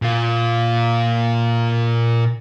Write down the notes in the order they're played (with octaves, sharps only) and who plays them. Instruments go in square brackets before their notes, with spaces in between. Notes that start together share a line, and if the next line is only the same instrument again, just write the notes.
[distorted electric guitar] A#2 F4